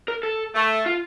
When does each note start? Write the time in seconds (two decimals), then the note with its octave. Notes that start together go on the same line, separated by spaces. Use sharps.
0.08 A#4
0.23 A4
0.54 A3
0.86 F4